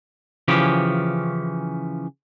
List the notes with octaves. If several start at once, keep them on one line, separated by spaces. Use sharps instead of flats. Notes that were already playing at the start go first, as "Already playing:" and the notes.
C#3 E3 F3 C#4 G4